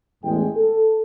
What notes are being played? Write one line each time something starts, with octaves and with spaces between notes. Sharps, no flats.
A1 E2 G#3 G5
A4